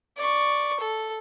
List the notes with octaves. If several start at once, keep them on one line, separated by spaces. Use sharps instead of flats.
D5 C#6
A4